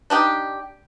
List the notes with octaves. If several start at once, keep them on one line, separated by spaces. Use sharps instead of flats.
D4 D#4 G4